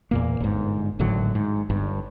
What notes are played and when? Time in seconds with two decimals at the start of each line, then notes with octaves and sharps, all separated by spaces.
0.11 E2 A#2 A#3
0.40 G1 G#2
0.99 G#1 A2 D3 F#3
1.35 G#2
1.70 G1 G2